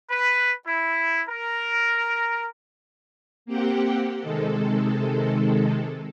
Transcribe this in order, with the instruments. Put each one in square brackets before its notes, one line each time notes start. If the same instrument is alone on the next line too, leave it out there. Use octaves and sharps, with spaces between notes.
[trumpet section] B4
E4
A#4
[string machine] A#3 C4 G4 F#5 G5
C3 D#3 G#3 A4